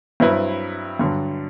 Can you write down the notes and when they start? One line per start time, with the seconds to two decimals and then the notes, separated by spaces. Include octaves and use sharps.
0.20 G2 F#3 C4 E4 B4
0.99 G2 D3 F#3